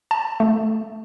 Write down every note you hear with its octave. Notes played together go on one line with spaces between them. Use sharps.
A5
A3